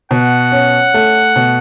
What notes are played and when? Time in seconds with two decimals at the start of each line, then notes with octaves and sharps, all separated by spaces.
0.11 B2 F#5
0.52 C#4
0.94 A3
1.36 B2